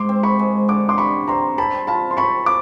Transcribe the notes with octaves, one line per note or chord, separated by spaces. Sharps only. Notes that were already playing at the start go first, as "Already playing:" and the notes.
Already playing: G#2 C6 D6
C4
B5 C#6
G#3
D3 D6
C6 D6
G3 B5 C#6
C4 A#5 C6
C4 A5 B5
F4 A5 B5
C6
C4 B5 C#6
D6